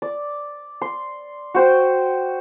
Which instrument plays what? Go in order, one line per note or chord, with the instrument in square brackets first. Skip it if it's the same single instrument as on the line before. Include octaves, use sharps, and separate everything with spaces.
[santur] D5
C6
F#4 C5 G5